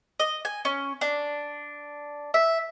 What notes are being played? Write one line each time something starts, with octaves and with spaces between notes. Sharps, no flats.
D#5
G#5
C#4
D4
E5